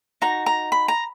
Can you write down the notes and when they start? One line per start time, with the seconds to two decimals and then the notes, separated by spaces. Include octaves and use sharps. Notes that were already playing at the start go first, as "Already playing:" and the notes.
0.22 D#4 F#4 A#5
0.46 A#5
0.72 B5
0.88 A#5